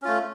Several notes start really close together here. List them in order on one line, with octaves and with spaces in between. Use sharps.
C#4 F4 A3